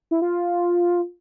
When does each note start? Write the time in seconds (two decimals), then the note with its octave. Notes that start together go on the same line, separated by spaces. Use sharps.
0.11 E4
0.22 F4